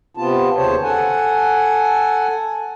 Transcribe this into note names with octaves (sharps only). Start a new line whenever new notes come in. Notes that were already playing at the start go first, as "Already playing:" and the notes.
C3 B3 C4 F4 A5
D#2 C#3 C5 C#5 A5
A4 F#5 G#5